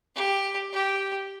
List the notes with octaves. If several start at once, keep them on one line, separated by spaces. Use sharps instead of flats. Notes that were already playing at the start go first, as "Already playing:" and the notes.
G4
G4